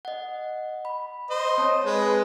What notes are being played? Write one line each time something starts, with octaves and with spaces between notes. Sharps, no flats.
D#5 F#5
B5
C5 D#5
C4 C#5 A5
G#3 B4